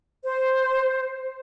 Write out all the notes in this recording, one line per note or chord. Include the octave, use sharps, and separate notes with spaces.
C5